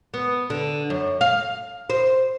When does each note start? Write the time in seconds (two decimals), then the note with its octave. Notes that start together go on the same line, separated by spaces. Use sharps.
0.14 B3
0.50 D3
0.90 F#2
1.21 F5
1.90 C5